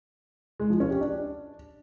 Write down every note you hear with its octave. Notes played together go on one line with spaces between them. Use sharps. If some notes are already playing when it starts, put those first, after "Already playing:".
G#3
F3
C#4
G4
D4